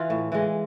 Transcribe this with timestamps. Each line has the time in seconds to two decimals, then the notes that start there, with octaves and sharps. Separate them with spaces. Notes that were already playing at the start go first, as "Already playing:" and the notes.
Already playing: E3 F4
0.10 A2
0.32 E3 G#3